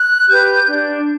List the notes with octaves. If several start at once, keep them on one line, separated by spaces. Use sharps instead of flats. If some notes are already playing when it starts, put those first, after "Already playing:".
Already playing: F#6
G4 B4 G6
D4